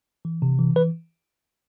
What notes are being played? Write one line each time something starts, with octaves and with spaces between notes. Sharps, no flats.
E3
C3
E3
E3 B4